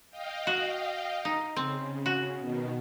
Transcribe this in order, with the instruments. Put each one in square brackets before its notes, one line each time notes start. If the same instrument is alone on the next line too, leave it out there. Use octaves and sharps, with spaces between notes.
[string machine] D#5 F5 G5
[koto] F#4
D#4
[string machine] C#3 [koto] C4
[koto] F#4
[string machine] B2 D#3